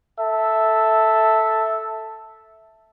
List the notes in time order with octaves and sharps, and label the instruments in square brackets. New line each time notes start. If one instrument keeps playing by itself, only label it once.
[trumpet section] A4 E5